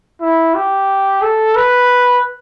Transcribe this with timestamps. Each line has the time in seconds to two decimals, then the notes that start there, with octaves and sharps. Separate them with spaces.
0.21 E4
0.55 G4
1.22 A4
1.56 B4